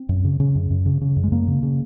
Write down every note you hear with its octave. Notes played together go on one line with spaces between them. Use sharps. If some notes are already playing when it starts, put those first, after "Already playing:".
Already playing: C4
F#2
C#3
C#3
F#2
F#2
C#3
C#3
F#2
G#3
F#2 A#3
C#3
C#3